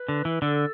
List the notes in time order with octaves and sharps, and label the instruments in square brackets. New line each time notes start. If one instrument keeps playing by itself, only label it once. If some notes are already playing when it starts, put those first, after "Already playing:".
Already playing: [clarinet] B4
[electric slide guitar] D3
E3
[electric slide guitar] D3 [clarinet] A4